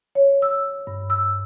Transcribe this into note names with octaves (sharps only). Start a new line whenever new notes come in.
C#5
E6
G2
E6